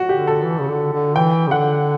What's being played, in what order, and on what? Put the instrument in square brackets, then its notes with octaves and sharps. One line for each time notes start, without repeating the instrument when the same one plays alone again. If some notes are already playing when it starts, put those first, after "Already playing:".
Already playing: [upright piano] F#4
[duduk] D3 [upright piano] G4
[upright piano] A4
[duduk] E3
C#3
D3
D3
[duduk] E3 [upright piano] G5
[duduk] C#3
[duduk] D3 [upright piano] F#5